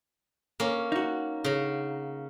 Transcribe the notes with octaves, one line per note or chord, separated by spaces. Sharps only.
A#3 C#4
D#4 F#4
C#3 A#5